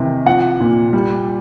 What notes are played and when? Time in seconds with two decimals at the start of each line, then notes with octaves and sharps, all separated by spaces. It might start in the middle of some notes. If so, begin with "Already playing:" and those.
Already playing: C3 D#3 E3
0.26 F3 F#5
0.60 A#2
0.93 G3